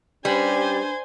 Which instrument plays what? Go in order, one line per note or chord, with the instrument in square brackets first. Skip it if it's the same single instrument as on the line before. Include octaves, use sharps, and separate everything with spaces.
[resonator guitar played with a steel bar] G3 [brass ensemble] C#4 G4 [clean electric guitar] D4 B4 [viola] C5 G#5